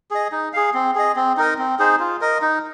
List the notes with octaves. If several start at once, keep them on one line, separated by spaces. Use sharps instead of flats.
G#4 D#5
D#4
G#4 F5
C4
G#4 D#5
C4
D#4 A#4 D#5
C4
D#4 G#4 C5
F4
A#4 D#5
D#4